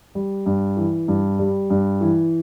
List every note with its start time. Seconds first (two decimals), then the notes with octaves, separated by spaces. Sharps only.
0.15 G3
0.46 G2
0.77 E3
1.08 G2
1.39 G3
1.70 G2
2.01 E3